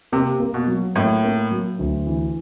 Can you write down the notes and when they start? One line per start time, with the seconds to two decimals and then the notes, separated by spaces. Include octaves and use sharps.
0.12 C3 A#3
0.40 A#3
0.54 B2
0.67 F#3
0.96 A2 A#3
1.24 A#3
1.51 F#3
1.79 D2
2.07 E3